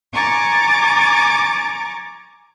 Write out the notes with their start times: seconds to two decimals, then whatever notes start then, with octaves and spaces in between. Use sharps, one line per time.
0.13 G#5 A#5 C#6 D6 A6